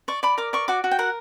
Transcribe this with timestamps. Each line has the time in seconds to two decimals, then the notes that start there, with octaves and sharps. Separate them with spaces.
0.08 D5 C#6
0.23 D5 B5
0.38 A#4 D6
0.53 D5 C#6
0.68 F#4 D6
0.84 F#4
0.91 G5
0.99 A#4 F#5